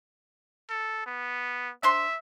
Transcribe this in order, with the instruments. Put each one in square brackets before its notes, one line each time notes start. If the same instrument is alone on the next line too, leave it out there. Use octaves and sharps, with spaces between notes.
[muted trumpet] A4
B3
[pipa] D4 C5 C6 [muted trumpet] E5